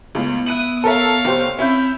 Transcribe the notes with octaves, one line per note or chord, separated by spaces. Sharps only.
C#2 A2 B3
E4 D#6 F#6 D#7 F#7
A4 A#4 C#5 E5 F5
F1 G4 C5
C4 C#4 E4 E5 G6